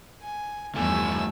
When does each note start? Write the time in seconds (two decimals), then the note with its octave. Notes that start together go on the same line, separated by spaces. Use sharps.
0.22 G#5
0.75 E2 G2 F3 A3 G#5 E6